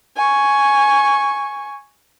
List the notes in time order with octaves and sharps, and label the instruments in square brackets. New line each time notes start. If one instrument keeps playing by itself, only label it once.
[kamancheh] G#5 C#6